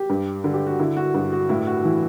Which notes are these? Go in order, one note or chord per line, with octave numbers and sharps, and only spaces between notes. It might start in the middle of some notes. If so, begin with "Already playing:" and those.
Already playing: G4
G2
D3
G4
F#4
D3 E4
F#4
G2 F#4
F#4
A2 E4
F#4
E3 E4